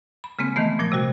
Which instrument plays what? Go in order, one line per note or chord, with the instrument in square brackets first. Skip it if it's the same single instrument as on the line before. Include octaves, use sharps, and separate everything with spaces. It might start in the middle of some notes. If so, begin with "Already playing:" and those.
[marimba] B5
C#3 G#3 A#3 C4
D#3 E3 A3 B3
A#2 F3 A#6
C3 G3 F#4